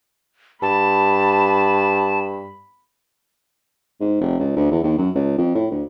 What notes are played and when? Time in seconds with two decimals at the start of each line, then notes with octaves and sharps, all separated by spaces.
0.62 G2 A5 B5
4.00 G#2
4.21 F1
4.39 C#2
4.56 D2
4.71 E2
4.84 D#2
4.98 F#2
5.15 C#2
5.38 F2
5.54 A2
5.71 D2